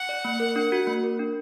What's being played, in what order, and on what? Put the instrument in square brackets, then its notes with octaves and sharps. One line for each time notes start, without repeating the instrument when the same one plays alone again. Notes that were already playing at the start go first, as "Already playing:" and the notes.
Already playing: [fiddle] F#5
[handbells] D5
A#3
A#4
D4
F#4
A#3
A#4
D4